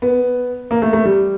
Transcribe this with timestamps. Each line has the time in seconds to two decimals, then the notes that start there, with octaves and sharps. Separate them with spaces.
0.02 B3
0.71 A#3
0.82 A3
0.93 A3
1.05 G3